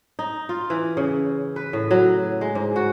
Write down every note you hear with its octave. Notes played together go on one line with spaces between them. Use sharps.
D#4
F4
E3
C#3
B4
A2
F#3
G#3
G#2
F#4